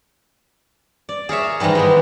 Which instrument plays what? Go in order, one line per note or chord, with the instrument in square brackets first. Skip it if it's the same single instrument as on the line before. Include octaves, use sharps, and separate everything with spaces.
[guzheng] D5
G#4 A#4 C#5 E5
G#2 D#3 E3 G3 B4
G3 G#3 B3